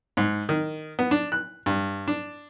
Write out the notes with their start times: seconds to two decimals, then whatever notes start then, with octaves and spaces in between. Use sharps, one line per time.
0.17 G#2
0.49 D#3
0.99 B3
1.11 D4
1.32 F#6
1.66 G2
2.08 D4